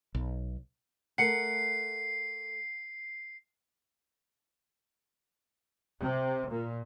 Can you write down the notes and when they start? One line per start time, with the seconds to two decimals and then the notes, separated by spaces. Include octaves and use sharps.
0.15 B1
1.18 A3 A4 A#4 F#5 C7 C#7
6.01 C3
6.49 A#2